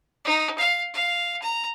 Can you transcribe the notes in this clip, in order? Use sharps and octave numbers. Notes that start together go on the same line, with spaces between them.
D#4
F5
F5
A#5